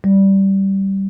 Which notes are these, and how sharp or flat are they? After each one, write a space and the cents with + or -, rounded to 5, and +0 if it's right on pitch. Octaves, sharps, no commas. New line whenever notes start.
G3 -10